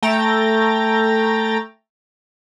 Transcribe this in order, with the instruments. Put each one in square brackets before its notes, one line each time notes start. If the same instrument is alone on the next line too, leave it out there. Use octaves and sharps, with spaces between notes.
[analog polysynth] A3 G5 A#5 A6